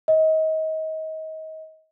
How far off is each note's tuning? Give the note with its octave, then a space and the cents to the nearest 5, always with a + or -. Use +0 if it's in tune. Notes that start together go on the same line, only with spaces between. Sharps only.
D#5 +30